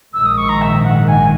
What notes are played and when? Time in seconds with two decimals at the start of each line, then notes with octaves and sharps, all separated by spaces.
0.14 A#1 G#2 D#3 E6
0.26 D#6
0.38 C#6
0.49 A#5
0.62 E5
0.84 F#5
1.08 G#5